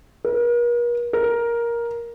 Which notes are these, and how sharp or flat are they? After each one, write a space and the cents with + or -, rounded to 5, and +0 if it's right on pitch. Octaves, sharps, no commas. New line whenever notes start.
A#4 +45
A#4 +10